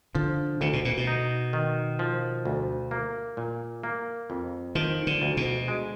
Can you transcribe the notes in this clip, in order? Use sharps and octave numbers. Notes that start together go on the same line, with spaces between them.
D3 F3
D2 D3
B2
A#2
B2
D#4
D#3
F3
D2
A#3
A#2
A#3
F2
D#3 F3
D3
D2
B2
G#3